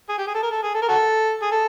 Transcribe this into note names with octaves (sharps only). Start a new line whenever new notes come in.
G#4
G4
G#4
A4
A#4
A4
G#4
A4
A#4
F#4 A4
G#4
A4